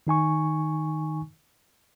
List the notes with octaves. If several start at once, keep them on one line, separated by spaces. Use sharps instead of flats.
D#3 D#4 G#5 C#6